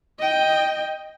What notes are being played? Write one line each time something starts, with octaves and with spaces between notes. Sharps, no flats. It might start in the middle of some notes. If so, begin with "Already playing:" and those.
D#5 G5